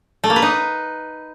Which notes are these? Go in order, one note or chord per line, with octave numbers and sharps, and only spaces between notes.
A3
A#3
B4
D#4